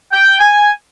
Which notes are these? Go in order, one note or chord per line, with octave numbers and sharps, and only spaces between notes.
G5
G#5